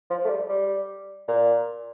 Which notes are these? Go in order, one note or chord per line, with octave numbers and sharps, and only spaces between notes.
F3
A3
G3
G3
A#2